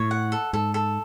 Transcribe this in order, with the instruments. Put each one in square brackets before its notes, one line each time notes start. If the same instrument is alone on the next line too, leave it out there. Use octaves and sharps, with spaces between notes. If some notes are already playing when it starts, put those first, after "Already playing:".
Already playing: [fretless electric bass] A2 [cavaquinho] C#5
[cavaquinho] F#5
A4
[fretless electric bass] G#2 [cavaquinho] A4
[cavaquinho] A4